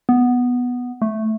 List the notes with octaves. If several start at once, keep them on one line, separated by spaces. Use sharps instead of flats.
B3
A3